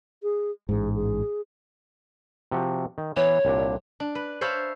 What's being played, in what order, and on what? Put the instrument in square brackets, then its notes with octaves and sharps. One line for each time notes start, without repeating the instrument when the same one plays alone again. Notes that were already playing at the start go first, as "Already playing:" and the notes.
[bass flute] G#4
[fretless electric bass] A1 G#2 [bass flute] G#4
[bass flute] G#4
[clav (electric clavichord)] C3 F3 F#4
D#3
[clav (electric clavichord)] E3 B3 [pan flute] C#5
[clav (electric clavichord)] C2 A#2 D4
[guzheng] D4
B4
C5 C#5 E5 F5 A5 B5